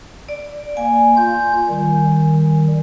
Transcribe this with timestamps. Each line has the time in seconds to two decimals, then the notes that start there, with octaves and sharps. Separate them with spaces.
0.29 D5
0.77 A#3 G#5
1.16 F4 G6
1.69 D#3 G3